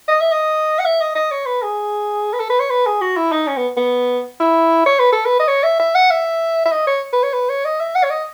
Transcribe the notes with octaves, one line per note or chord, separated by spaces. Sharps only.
D#5
E5
D#5
F#5
E5
D#5
D#5
C#5
B4
G#4
B4
A4
B4
C#5
B4
G#4
F#4
E4
D#4
C#4
B3
B3
E4
C#5
B4
A4
B4
D#5
C#5
E5
E5
F#5
E5
E5
D#5
C#5
B4
C#5
B4
C#5
D#5
E5
F#5
C#5
D#5